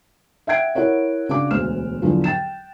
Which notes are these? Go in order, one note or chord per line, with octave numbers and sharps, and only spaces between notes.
E5 F#5 G5 G#6 D7
E4 A#4 C#5 F#5
C#3 D4 F#4 D6
E1 D2 F6 E7
E2 D3 F3 F#3
G5 A6 E7